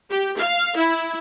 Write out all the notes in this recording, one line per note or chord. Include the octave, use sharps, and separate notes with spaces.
G4
F5
E4